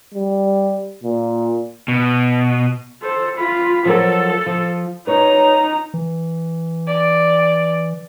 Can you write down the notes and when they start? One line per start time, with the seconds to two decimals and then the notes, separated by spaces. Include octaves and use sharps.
0.14 G3
1.03 A#2
1.88 B2
3.02 A4 C5
3.37 F4 B5
3.85 F3 F#3 A4 A#4
4.46 F3
5.07 D#4 B4 C#5 A#5
5.94 E3
6.88 D5